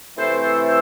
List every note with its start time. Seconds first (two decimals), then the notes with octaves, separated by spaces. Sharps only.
0.16 C3 E3 A3 A4 C5
0.41 A4 C5
0.66 A4 C5